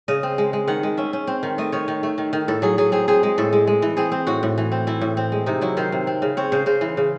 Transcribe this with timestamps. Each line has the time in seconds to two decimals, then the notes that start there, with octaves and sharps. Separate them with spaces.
0.08 C#3 D#5
0.23 C4
0.38 G#3
0.53 G#3
0.67 D#3 F#5
0.83 G#3
0.97 C#4 E5
1.13 C#4
1.27 C4
1.43 D#3
1.58 A3 D#5
1.72 D#3 C#5
1.88 D#3
2.03 A3
2.18 D#3
2.33 D#3
2.48 A2 A4
2.62 F#3 G#4
2.78 F#3 G#4
2.92 C4 G#4
3.08 C4 G#4
3.23 G#3
3.38 A2 A4
3.53 G#3
3.67 G#3
3.82 E3
3.97 C4 G#4
4.12 C4
4.27 A2 F#4
4.43 A2
4.58 E3
4.72 C4
4.87 E3 E4
5.01 A2
5.17 C4
5.32 G#3
5.46 C3 D#4
5.61 F#3 E4
5.77 D#3 C5
5.92 C3
6.07 C4
6.22 C#3
6.37 C4 C#5
6.52 C#3 C5
6.66 C#3 C5
6.81 E3
6.97 C#3